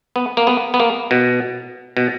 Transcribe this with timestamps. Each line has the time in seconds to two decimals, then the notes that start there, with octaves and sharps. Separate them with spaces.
0.16 B3
0.37 A#3
0.47 B3
0.74 B3
0.80 A#3
1.11 B2
1.97 B2